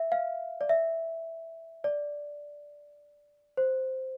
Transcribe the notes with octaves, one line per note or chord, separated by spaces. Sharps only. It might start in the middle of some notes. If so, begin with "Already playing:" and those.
Already playing: E5
F5
D5
E5
D5
C5